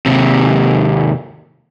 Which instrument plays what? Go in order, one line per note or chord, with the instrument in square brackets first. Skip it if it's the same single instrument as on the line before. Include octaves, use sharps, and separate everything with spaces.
[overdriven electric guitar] D#2 C3